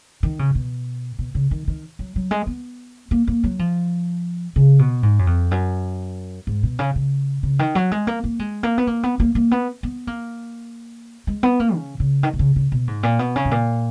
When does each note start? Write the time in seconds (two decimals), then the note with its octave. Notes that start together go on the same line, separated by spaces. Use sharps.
0.23 D#3
0.39 C#3
0.55 B2
1.19 B2
1.35 C#3
1.51 D#3
1.68 D#3
1.99 F#3
2.16 F#3
2.31 G#3
2.47 B3
3.11 A#3
3.27 A#3
3.44 F#3
3.59 F3
4.56 C#3
4.79 B2
5.03 G#2
5.19 F#2
5.27 F2
5.51 F#2
6.47 G#2
6.63 B2
6.79 C#3
6.95 C#3
7.43 C#3
7.59 D#3
7.75 F#3
7.92 G#3
8.07 A#3
8.24 A#3
8.39 G#3
8.63 A#3
8.78 B3
8.87 A#3
9.03 B3
9.20 A#3
9.35 A#3
9.51 B3
9.83 B3
10.07 A#3
11.27 G#3
11.43 B3
11.60 A#3
11.75 C#3
12.00 C#3
12.23 D#3
12.33 B2
12.39 C#3
12.56 C#3
12.72 B2
12.87 G#2
13.03 A#2
13.19 B2
13.36 C#3
13.45 G#2
13.51 A#2